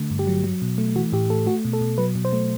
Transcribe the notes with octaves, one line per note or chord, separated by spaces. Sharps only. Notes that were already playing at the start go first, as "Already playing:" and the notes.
Already playing: D3 A3
G2
G4
F#3
F#3
B2
A3
E3 F#4
A2 G4
A3 A4
A3 F#4
B2
A4
B2
F#3 B4
B2
C5
A3